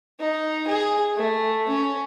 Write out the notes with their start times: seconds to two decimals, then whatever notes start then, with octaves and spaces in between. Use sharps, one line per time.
0.20 D#4
0.68 G#4
1.16 A3
1.69 C#4